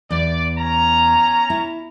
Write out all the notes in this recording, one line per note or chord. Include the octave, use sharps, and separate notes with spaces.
E2 D5
C#4 A#5
E4